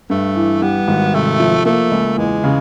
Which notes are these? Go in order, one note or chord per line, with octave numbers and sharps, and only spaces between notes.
G2 A3
E3
G3 B3
G#1
C3 A3
F3
A3 A#3
C#2
E2 G#3
C#3